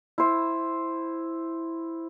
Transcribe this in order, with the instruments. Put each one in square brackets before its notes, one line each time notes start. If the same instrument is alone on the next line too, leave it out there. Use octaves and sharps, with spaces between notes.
[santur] E4 C5